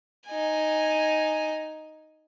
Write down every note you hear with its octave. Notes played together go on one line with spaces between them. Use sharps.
D#4 G#5